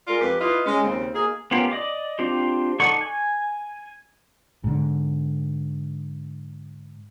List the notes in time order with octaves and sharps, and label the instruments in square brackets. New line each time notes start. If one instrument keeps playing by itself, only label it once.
[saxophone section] G#3 F4 A#4 D5
F2 G4 B4
E4 F4 B4 D#5
G#3 C#4
D#2 C#3 C4
A#3 D#4 G#4
[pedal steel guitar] B3 C#4 F4 G4 A#4
D5 D#5 D6
C4 D4 F4 G4
D#4 A4 D5 F#5 C#6
G#5
[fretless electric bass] G#2 D3